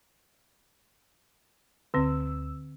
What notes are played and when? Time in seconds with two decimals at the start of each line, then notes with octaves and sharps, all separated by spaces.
1.94 D2 D3 C4 E6